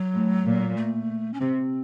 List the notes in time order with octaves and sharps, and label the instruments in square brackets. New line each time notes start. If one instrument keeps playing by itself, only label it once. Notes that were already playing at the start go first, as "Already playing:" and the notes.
Already playing: [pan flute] F#3
[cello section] A2
A#2
[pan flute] A3
C#4
[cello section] C3 [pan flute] C4